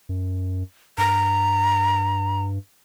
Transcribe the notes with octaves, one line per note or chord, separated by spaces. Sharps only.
F#2
G2 A#5